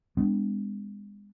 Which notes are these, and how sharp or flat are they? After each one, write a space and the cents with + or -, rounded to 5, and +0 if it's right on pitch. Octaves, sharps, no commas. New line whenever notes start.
G#3 -30 B3 +30 D4 +0